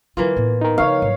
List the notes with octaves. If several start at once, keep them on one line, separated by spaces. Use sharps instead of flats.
D3 E3 F#3 A#3 F4
A2 B3
D#4 A#4
C#3 F3 C#5 F5
G#2 F#3